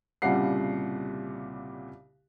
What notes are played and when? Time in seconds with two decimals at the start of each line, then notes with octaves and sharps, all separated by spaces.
0.22 C2 A#2 C#3 G3 F#5 C7